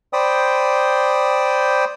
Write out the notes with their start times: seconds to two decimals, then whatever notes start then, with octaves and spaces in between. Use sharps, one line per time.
0.13 C5 D5 G5 B5 D#6